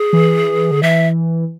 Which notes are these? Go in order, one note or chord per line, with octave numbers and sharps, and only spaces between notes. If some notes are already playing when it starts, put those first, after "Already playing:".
Already playing: G#4
E3
D3
E3 E5